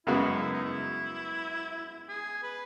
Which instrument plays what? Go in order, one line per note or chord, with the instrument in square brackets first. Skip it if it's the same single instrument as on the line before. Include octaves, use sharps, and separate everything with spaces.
[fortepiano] F#2 C#3 G#3 B3 F#4 [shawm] E4
[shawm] E4
D#4
E4
G#4
B4